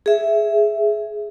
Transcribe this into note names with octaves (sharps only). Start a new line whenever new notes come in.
G#4 E5